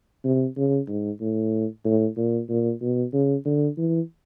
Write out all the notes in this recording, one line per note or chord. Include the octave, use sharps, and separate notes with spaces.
C3
C#3
G#2
A2
A2
A#2
A#2
B2
C#3
D3
E3